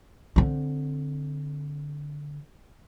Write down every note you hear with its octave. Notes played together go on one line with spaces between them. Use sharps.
D3 C4